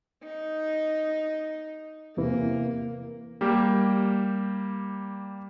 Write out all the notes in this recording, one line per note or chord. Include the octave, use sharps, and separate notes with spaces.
D#4
E2 C3 E3 A#3
G3 A#3 G4